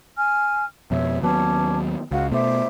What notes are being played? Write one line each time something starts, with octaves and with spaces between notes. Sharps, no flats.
G#5 F6
F2 B2 C#5 E5
D#2 F#3 B3 C#4 A5 D6
C#2 F#4 F5 F#5
B2 A3 C5 E5 D6